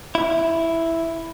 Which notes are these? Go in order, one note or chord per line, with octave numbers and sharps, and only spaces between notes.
E4